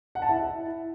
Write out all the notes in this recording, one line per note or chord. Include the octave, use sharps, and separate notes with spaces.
F#5
A5
E4